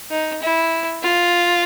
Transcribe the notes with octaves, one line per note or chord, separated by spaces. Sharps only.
D#4
E4
F4